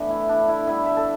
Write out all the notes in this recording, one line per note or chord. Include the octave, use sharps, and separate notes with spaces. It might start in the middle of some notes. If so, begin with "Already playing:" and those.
Already playing: A2 E3 B3 D4
E4
D4
E4
D3 G3 B3 E4
E5
A4